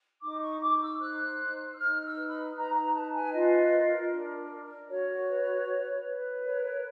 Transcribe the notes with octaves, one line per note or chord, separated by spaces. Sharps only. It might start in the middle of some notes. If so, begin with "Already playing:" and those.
D#4 D6
C#6
D#4 D6
E6
C5 F#6
D#4
E6
D#4 F6
E6
B4
B5
D#4 A#5
A#5
B4 A5
G#5
F4 D#5
A#4
D4
A#4
F#4 C#5
B4
B4
B4
A#4 C#5
C#5